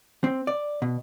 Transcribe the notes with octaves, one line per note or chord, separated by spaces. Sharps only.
C4
D5
B2